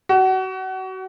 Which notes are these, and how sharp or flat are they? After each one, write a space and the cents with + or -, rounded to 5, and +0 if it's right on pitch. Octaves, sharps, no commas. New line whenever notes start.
F#4 +30